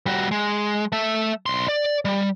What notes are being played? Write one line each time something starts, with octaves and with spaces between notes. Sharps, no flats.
G3 F#4
G#3
A3 E5
B1 C6
D5
G3